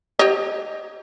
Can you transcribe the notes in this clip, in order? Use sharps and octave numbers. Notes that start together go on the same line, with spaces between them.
G4 C#5 D#5